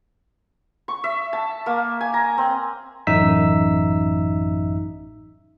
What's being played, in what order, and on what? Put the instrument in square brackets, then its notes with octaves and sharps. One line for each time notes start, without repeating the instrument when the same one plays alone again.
[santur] C#6
E5
A5
A#3
G#5
A#5
C4
[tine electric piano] A1 F#2 D#4 E5 E6 B6